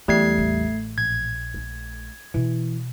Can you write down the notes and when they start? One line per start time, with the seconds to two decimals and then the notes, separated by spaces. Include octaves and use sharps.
0.08 E2 F#3 G3 A3 G#6 C7
0.38 A1
0.98 A#1 G#6
1.54 A3
2.34 B2 E3